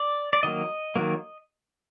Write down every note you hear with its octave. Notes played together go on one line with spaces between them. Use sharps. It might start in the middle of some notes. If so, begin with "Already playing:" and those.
Already playing: D5
D5
D#3 F#3 A#3 D#5
D#3 F#3 A#3